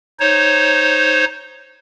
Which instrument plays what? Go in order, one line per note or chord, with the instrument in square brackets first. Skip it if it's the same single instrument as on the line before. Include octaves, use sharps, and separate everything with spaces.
[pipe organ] D#4 C5 C#5